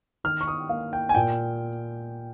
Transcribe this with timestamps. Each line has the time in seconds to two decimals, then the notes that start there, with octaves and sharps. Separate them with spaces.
0.24 D#3 F6
0.41 C#6
0.48 D#6
0.69 A#3 F5
0.93 G5
1.09 G#5
1.15 A#2 G5